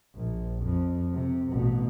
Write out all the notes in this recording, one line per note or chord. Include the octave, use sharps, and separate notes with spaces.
A#1
F2
C3
A1 B2